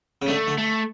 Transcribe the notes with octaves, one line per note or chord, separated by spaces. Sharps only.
C#3
D3 A3
D3
A3